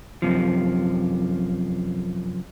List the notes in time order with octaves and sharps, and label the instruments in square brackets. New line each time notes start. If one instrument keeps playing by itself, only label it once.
[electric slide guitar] F#2 C3 F3